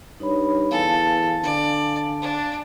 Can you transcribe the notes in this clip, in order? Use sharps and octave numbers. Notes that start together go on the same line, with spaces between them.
G2 D#4 C#5 B5
E2 A4 F5 G#5 A5
D3 D5
D4